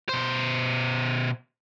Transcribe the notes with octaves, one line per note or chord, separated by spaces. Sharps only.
B2 C5